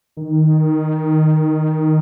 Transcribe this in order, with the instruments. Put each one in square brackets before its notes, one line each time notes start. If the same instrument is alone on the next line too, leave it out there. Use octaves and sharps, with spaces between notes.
[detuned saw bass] D#3